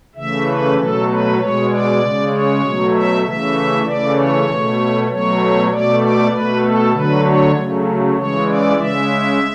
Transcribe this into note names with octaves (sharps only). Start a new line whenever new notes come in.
C#3 E3 A3 E5
B4
B2 F#3 A3 A4
B4
B2 G#3 C#5
D5
C#3 G#3
C#5
B2 F#3 A3
E5
C#3 E3 A3 E5
C#3 E3 A3 D5
C#5
B2 A3
B2 F#3 A3 C#5
B2 A3 D5
D5
B2 A3 B4
A4
D3 F#3 A3 B4
C#5
C#3 F#3 A3
C#3 E3 G#3 C#5
D5
C#3 G#3 E5